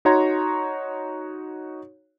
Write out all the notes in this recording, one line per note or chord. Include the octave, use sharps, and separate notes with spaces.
D#4 F#4 C#5 A#5 C6 G#6